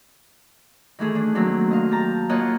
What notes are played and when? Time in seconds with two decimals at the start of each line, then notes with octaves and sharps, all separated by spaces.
0.99 D#3 E3 A3 G#4
1.15 D4
1.35 D#3 F#3 A3 A#3 C4 D4
1.71 D#5 F5
1.91 G4 A5 A#5
2.29 A#3 F4 C#5 D#5 F#5